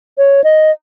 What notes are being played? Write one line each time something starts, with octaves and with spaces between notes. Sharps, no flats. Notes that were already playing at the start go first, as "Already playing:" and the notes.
C#5
D#5